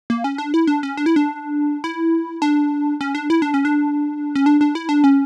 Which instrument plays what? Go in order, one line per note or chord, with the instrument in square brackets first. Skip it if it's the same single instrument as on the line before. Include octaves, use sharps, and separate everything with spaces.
[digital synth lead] A#3
C#4
D4
E4
D4
C#4
D4
E4
D4
E4
D4
C#4
D4
E4
D4
C#4
D4
C#4
D4
D4
E4
D4
C#4